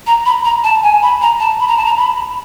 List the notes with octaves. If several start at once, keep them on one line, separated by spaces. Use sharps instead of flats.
A#5
B5
A#5
A5
G#5
B5
A#5
A5
B5
A#5
A5
A#5
B5